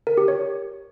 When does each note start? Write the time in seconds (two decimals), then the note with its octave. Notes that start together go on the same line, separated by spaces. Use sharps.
0.07 A#4
0.17 G4
0.28 C#5